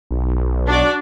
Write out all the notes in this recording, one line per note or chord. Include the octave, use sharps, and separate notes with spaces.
B1
D4 F#4 D5